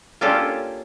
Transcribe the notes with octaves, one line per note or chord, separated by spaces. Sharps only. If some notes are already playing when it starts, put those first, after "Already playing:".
A#3 C#4 D4 F4 G4 A4